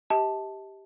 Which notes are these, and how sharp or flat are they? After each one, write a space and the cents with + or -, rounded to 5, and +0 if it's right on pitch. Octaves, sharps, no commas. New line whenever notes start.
G4 +0 D#5 +45 A5 +0